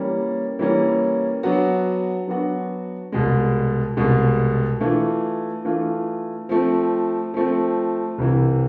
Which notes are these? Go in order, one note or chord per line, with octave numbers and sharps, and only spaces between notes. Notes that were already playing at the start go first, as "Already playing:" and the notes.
Already playing: E3 G3 A#3 C#4
E3 G3 A#3 C#4
F#3 B3 D4 F#4
F#3 B3 D4 F#4
C2 B2 G#3
C2 B2 G#3
E3 A3 D4 F4
E3 A3 D4 F4
F3 A3 C4
F3 A3 C4
C2 C3 E3